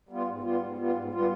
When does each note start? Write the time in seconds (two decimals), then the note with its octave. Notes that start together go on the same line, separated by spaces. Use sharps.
0.09 G3 B3 F4
0.26 G#2
0.43 G3 B3 F4
0.61 G#2
0.78 G3 B3 F4
0.95 G#2
1.12 G3 B3 F4